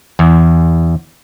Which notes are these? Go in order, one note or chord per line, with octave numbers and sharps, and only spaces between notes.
E2